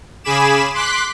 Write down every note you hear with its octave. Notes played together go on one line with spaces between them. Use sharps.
C#3 G#4 G#5 B5 D6 E7
C6 D6 F#6 B6